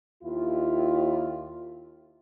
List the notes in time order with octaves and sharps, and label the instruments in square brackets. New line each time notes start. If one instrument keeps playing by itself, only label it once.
[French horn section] D#2 E4 F4